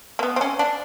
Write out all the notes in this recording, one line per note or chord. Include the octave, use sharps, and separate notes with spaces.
A#3
B3
C4
C#4
D4